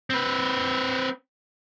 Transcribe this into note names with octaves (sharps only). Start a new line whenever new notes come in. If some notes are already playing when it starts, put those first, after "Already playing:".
C4 B4